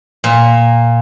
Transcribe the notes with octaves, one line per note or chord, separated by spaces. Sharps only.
A#2